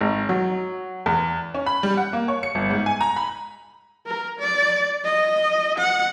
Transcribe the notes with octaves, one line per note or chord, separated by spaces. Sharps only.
G#1
F#3
E2
C#4
B5
G3
F#5
A#3
C#5
C#7
G1
G#2
G#5
A#5
B5
A#4
D5
D#5
F#5